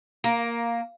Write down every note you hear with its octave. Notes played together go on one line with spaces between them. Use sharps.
A#3